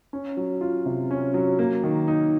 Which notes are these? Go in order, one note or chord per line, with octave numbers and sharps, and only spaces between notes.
C#4
F#3
F4
C3
C#4
F#3
A#3
D#3
D#4